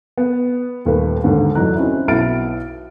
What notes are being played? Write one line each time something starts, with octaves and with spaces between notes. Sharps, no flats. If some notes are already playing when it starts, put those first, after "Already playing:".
B3
D#1 D#2 A3 A#4 B4
D#2 G#2 D3
F1 E3 F#3 D#4 A#5 F#6
C4 C#4 D#4 E4
B1 B3 E4 F6 A6 D7